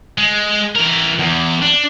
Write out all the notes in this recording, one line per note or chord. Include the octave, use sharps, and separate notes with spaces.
G#3
E3 A#4
E2
D4